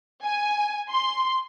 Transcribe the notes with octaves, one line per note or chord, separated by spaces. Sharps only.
G#5
C6